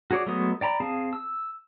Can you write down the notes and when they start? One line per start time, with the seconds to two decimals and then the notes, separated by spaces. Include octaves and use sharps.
0.11 F#4 G#4 C#5 D5
0.26 F#3 G#3 A3 B3 D#6
0.61 D5 G5 A#5 B5
0.80 C4 G#4 F5 A5
1.13 E6